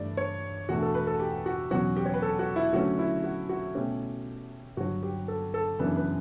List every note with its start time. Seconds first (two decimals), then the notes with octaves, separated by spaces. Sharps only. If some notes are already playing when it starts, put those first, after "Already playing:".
Already playing: G2 E3 A3 D5
0.17 C#5
0.69 E2 B2 A3 D4 F#4
0.82 A4
0.94 B4
1.07 A4
1.20 G4
1.46 F#4
1.71 E2 B2 F#3 C#4 F#4
1.96 G4
2.06 C#5
2.14 B4
2.22 A4
2.39 F#4
2.56 E4
2.73 D3 F#3 A3 C#4 F#4
2.99 E4
3.24 F#4
3.49 F#4
3.75 B2 A3 C#4 G4
4.77 G2 D3 F#3 F#4
5.03 G4
5.28 A4
5.54 A4
5.79 F#2 C#3 E3 B3 D4 B4
5.96 B4